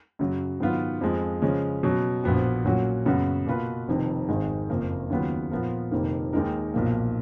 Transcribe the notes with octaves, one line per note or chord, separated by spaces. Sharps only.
F#2 C#3 F#3
G#2 D#3 F#3 B3 F4
F2 F3 G#3
C#3 F3 G#3 C#4
B2 F#3 C#4
A#1 A#2 F3 B3 F#4
A#2 F#3 C#4 F#4
F#2 C#3 F#3 B3 F#4
B2 A#3 F4 B4
F1 F2 D#3
G#1 G#2 D#3 G#3
F#1 F2 F3 A#3
D#2 C#3 F#3 B3 F4
A#2 F3 B3 F4 A#4
F1 F2 D#3 A#3
D#2 D#3 G#3 D#4 A#4
B1 A#2 F3 A#3